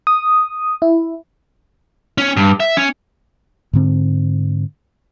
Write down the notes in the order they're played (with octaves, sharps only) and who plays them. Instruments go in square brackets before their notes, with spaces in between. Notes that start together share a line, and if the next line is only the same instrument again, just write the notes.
[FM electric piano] D#6
E4
[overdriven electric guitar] C#4
G2
E5
C#4
[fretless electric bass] G#2 D3 C4